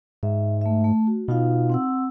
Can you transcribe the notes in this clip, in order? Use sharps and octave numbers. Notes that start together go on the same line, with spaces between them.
G#2 E5
A3 E5
A3
F#4
B2 D#4 F4 F5
C4 F#5 E6